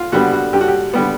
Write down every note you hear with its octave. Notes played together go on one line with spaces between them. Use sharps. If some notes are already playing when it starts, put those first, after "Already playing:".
Already playing: F4
D3 G3 B3 F#4
F#4
G2 G4
F#4
G4
D3 G3 B3